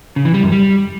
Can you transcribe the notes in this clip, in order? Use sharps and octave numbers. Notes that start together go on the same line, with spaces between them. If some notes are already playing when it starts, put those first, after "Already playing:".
C#3
E3
G3
F#2
G3